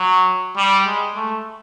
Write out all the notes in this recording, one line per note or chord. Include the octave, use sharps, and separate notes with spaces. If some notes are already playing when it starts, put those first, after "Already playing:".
Already playing: F#3
G3
G#3
A3